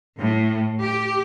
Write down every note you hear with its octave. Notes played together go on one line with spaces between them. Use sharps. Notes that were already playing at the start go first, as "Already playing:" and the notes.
A2
G4